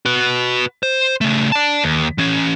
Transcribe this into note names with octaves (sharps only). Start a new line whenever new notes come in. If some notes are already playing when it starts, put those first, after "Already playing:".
F#4 B4
C5
C#3 A3
D5 A5
D#2
E3 C#4